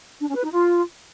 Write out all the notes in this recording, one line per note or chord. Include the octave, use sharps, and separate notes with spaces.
D4
C#4
B4
D#4
F4